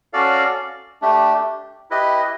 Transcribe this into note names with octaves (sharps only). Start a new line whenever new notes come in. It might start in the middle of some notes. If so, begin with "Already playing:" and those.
C#4 F#4 A4 D5 F5
A3 D4 G4
E4 G4 B4 D#5